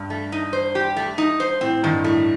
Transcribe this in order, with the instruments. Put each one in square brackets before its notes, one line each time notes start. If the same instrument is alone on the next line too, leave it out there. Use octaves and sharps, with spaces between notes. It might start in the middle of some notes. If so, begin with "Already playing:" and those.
Already playing: [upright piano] G2
[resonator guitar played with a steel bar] A3
D#4
C5
G4
A3
D#4
C5
[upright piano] A2 [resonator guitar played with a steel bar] C4
[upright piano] G2 [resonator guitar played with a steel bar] D#3
[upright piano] A2 [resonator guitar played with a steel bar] A3